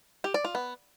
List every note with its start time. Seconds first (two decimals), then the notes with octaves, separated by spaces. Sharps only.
0.24 G4
0.34 D5
0.45 F4
0.55 B3